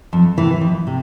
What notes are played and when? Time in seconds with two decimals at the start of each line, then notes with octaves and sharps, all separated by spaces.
0.13 F2
0.38 C3 E3
0.61 F2
0.87 C3